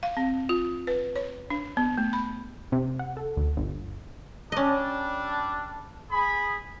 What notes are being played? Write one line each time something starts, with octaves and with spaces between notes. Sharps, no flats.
F5
C4
F4
B4
C#5
D4
B3
A3
B5
C3
F#5
A4
D2
G1
G3 C#4 D4 D#5
G#4 B5